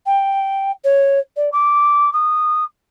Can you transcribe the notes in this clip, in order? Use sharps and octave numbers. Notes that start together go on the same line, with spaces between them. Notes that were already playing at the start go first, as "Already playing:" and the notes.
G5
C#5
D5
D6
D#6